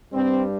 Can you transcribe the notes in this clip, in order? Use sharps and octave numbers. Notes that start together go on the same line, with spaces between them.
G2 G3 C4